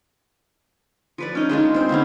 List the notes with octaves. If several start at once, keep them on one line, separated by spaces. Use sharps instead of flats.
F3 B4 D5
C#4 D#4
D#3 G#3 D4 F4
C4 C5
D3 A#3 B3 C#4